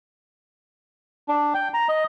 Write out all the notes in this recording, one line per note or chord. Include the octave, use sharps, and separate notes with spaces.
D4
G5
A#5
D#5